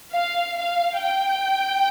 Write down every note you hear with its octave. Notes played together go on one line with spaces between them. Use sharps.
F5
F5
G5